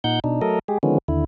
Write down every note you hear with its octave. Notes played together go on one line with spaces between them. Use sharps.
A#2 D#4 F#5 G6
B2 D4 D#4
F#3 A3 A4 A#4 D#5
G#3 G4 G#4
D3 D#3 F3 G#3 B3 C#4
D#2 D3 E4